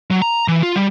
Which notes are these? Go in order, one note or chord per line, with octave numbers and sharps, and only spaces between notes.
F#3
A#5
E3
F4
G3